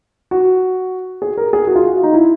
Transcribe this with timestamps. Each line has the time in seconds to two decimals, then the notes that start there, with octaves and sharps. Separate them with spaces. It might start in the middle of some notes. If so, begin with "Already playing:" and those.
0.31 F#4
1.22 G#4
1.37 A#4
1.53 G#4
1.67 F#4
1.76 F4
1.84 F#4
2.03 D#4
2.14 E4